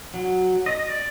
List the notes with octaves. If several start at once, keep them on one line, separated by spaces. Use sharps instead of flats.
F#3
D#5
D5